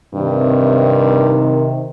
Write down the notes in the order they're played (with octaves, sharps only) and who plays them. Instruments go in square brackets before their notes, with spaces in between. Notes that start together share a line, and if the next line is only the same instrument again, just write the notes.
[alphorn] G2 [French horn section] C3 D#3